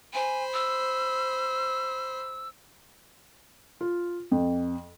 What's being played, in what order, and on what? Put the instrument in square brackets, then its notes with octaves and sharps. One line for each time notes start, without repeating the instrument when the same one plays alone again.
[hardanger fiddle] C5 B5 [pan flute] G#5
[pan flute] E6
[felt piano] F4
F2